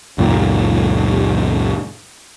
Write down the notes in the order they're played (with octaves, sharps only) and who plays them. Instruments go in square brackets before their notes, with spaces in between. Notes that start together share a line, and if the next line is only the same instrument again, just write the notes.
[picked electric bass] C#2 F#2 A#2 D#3